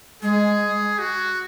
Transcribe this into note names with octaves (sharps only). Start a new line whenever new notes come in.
G#3 G#4
F#4